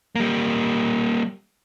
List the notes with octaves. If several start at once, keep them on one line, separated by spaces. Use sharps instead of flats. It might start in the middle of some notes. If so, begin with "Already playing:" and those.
G3 A#3